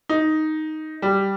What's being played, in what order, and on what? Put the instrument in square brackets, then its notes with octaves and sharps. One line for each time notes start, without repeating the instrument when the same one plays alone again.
[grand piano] D#4
G3